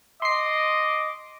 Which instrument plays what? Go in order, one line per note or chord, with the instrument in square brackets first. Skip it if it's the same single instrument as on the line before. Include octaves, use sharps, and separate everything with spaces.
[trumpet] D#5 [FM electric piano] C6 C7 [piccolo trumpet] D6